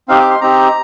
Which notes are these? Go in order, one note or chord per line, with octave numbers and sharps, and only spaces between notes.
C4 D#4 G4 F5
D6
C6
C4 D#4 G4 A#5